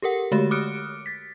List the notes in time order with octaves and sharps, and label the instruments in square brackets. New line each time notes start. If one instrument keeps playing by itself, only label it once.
[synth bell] G4 A4 A#4 F#5
D3 G#3 A3 F#4 G4 C#5
D6 D#6 F6 F#6 C#7 D7
A6 B6